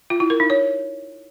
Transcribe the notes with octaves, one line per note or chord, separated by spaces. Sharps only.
F4
E4
A#4
D#4
C#5